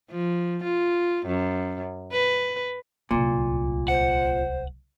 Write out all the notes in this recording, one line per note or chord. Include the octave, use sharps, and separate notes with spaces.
F3
F4
F#2
B4
D1 C2 A#2
C5 F#5